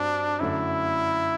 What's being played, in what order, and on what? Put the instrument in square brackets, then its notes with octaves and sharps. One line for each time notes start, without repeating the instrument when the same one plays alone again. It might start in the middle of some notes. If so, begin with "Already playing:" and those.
Already playing: [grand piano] G2 C4 F#4 [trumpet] D4
[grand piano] F#2 D3 A3 [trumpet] E4